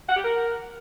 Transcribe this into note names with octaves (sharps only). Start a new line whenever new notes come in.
F#5
G4
A#4